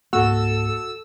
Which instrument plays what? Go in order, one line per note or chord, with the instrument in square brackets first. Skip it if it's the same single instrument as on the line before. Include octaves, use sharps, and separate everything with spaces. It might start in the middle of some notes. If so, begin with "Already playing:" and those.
[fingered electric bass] C#2 G#2 A#3 [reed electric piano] F#4 [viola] A4 [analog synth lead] E6